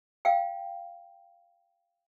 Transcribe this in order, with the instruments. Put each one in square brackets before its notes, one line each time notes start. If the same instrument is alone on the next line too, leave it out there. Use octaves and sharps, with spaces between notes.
[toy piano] F5 G5